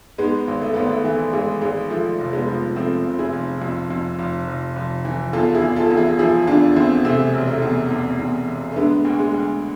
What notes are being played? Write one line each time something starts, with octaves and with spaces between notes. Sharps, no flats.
G#2 G#3 B3
G#1
A3
G#1 B3
A3
E3 A3
G#1 G#3
G#1 G#3
F3 A3
F1
G#3 B3
F3
F3 A3 C4
F1
E4 G#4
F1
F2
F2
F1
F1
F1
E3
E2 F4 A4
E4 G#4
E2
F4 A4
E2
E4 G#4
F3 E4 G#4
E2 D4 F4
E2 C4 E4
C3 A3 C4
E1
A3
E2
E2
E2
E1
A3
D3 G#3 B3
D2
G#3
D2